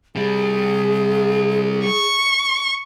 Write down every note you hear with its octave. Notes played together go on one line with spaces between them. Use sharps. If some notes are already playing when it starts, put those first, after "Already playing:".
C3 G3 G#4
C#6